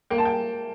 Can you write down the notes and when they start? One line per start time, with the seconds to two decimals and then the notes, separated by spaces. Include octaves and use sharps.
0.10 A#3 G5
0.18 A5
0.25 G5